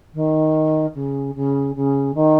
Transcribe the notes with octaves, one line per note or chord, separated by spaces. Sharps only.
D#3
C#3
C#3
C#3
D#3